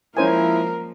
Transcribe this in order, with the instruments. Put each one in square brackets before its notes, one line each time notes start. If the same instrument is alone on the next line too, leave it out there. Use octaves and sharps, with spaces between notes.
[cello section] F3 G#3 A#3 [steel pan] C#4 C5 G#5 [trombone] E4 [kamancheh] A#4